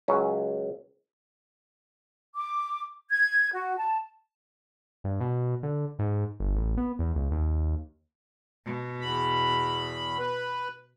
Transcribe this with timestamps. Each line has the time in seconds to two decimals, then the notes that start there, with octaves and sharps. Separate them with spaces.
0.08 C#2 F#3 C#4
2.36 D6
3.10 G#6
3.53 F#4
3.77 A5
5.04 G2
5.21 B2
5.63 D3
5.99 G#2
6.40 G1
6.56 A1
6.77 B3
6.99 E2
7.15 C#2
7.31 D#2
8.66 B2
9.01 E2 B5
10.19 B4